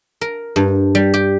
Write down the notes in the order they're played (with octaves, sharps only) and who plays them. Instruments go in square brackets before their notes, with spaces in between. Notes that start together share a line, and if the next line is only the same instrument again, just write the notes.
[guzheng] A#4
G2
G3
G4